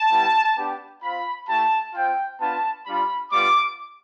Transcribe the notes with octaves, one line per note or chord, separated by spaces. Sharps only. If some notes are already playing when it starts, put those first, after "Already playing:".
Already playing: A5
G3 B3 E4 G4
B3 D4 G4
C4 F4 B5
A3 E4 G4 A5
C4 F4 G5
B3 D4 F4 A5
G3 D4 F4 B5
G3 B3 F4 D6